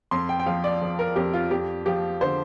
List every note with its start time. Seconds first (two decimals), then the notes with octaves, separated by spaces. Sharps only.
0.11 F2 C6
0.29 G5
0.39 G5
0.46 F3 F5
0.64 D5
0.81 F3
0.99 A#4
1.16 F2 G4
1.33 F4
1.51 F2 G4
1.86 F3 G4
2.21 D3 C5